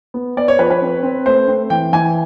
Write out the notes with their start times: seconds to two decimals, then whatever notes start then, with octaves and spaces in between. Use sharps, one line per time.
0.14 B3
0.37 B3 D5
0.48 C#5
0.59 F3 B4
0.70 B4
0.82 C4
1.03 C4
1.26 A3 C5
1.48 C4
1.70 E3 G5
1.93 E3 G#5